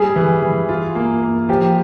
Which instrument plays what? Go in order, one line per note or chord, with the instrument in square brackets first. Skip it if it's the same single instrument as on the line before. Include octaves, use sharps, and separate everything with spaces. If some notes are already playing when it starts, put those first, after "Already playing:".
Already playing: [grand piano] G3 [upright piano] G#4
[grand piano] E3
E3
F4
A#3
A#3
[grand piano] F3 [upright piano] G4